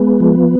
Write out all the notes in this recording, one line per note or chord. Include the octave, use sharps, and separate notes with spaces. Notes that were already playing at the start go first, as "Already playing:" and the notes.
Already playing: G#3 B3
F3